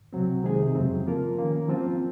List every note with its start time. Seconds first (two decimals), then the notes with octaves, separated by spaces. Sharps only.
0.13 C2 C3 F#3 C4
0.44 C3 D#3 G#3 D#4 G#4
0.75 F2 C#3 F#3 C4
1.06 F3 A#3 F4 A#4
1.37 D#3 A#3 C#4
1.68 F3 C4 F4